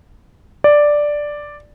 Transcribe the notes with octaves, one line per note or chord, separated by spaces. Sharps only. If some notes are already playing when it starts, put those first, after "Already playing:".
D5